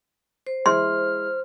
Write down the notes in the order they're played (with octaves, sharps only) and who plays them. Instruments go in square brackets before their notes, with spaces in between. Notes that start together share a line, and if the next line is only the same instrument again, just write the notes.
[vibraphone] C5
[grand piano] G#3 E4 [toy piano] C6 [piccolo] F6